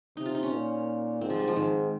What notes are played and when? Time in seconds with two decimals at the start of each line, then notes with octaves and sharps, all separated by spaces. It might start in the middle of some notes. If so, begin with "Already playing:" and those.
0.17 C3 D#4
0.26 F4
0.35 D#4
0.43 C#4
0.53 A#2
1.21 G#2 C4
1.30 F3
1.39 G3
1.48 F3
1.56 G#2 D#3